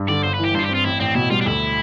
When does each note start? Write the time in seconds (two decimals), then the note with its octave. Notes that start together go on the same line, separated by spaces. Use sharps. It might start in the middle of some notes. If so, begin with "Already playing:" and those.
Already playing: G2
0.08 D3 D5
0.24 G1 C5
0.34 B4
0.39 E3
0.44 G4
0.54 G2 C5
0.59 F4
0.65 C4 G4
0.75 F4
0.84 A1 E4
1.00 A1 C4
1.15 B2 E4
1.30 G3 F4
1.41 D4
1.46 D2 E4